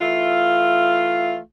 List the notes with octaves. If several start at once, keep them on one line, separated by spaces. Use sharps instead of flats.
E3 A3 F4